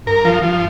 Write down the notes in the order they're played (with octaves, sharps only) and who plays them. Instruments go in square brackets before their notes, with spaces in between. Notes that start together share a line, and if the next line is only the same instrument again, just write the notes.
[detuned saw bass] G2 [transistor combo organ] A#4
[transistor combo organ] F3
F3